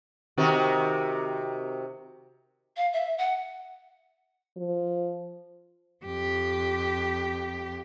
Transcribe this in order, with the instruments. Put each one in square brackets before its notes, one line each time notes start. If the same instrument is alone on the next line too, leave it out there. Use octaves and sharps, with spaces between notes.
[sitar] C3 D#3 F#4
[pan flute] F5
E5
F#5
[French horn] F3
[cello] F2 G4